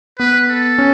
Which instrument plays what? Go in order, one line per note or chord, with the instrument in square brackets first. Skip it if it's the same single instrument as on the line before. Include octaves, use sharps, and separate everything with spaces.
[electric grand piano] B3 [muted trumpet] B4
[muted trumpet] A4
[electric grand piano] C#4